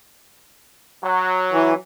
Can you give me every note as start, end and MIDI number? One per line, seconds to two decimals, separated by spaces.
1.04 1.74 54
1.52 1.74 52